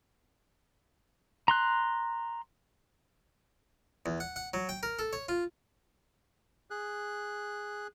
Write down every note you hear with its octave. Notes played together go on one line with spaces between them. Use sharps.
A#5 C6 F#6
E2
F#5
F#5
F#3
G5
A#4
A4
C#5
F4
G#4 F#6